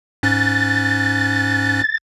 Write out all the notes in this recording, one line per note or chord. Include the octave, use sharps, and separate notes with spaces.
G#2 C#4 F#6 A6